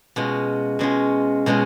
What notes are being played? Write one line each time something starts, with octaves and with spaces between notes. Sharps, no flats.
B2 G#3 C#4 F4
B2 G#3 C#4 F4
B2 G#3 C#4 F4